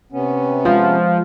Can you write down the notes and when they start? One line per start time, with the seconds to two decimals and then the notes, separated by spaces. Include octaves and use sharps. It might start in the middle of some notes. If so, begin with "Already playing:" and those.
0.12 C3 B3 C#4
0.65 F3 G#3 F4